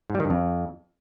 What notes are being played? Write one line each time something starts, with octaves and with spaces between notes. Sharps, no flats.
G#2
G3
D#3
G2
F2